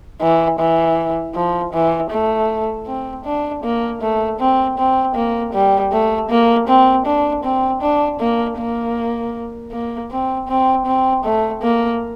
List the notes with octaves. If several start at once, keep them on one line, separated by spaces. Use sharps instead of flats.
E3
E3
F3
E3
A3
C4
D4
A#3
A3
C4
C4
A#3
G3
A3
A#3
C4
D4
C4
D4
A#3
A#3
A#3
C4
C4
C4
A3
A#3